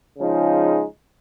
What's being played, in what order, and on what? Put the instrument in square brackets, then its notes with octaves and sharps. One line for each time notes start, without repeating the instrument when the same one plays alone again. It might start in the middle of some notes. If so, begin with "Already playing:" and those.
[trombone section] C#3 F3 G#3 D#4